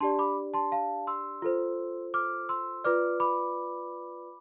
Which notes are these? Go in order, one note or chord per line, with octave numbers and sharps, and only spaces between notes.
D4 G4 D5 A5 C6
B5 D6
A5 C6
F5 A5
C6 E6
F4 A4 C5
D6 F6
C6 E6
F4 B4 D5 D6 F6
B5 D6